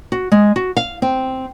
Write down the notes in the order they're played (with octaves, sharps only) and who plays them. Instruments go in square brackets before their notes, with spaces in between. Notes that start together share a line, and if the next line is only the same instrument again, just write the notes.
[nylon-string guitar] F#4
G#3
F#4
F5
C4